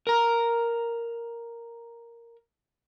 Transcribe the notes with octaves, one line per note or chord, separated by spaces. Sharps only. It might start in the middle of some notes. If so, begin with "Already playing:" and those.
A#4 A#5